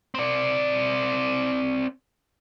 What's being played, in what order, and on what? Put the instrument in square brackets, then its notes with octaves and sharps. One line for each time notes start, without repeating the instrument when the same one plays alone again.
[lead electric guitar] C4 D5